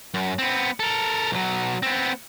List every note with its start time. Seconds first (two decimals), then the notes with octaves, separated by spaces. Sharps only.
0.14 F#2
0.39 B3 C4
0.80 A4 A#4
1.32 B1 F#3
1.83 B3 C4